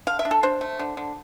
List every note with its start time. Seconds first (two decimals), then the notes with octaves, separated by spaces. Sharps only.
0.07 D3 F5
0.19 E5
0.25 D4
0.31 A4
0.43 D4 C5
0.61 A3
0.79 D3
0.97 D3